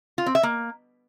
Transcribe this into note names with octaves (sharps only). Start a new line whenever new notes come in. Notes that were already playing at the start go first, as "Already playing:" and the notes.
F4
C4
E5
A#3